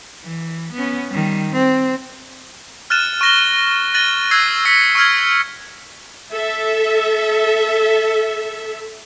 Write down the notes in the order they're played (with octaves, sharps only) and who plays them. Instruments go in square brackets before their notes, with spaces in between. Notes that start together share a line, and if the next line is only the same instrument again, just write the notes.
[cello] E3
B3 C#4
D#3 G3
C4
[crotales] F6 F#6 A6 D#7 E7
C#6 A#6 G7
F#6 A6 A#6 D#7 F#7 G7
E6 F#6 G#6 A#6 C7
E6 B6 C#7
C#6 E6 F6 G#6
[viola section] A4 E5